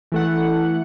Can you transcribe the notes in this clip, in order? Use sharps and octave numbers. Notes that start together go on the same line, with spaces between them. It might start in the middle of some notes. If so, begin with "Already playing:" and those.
E3 A3 F#5